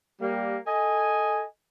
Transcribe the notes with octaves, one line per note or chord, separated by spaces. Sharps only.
G3 A#3
A4 D#5 G#5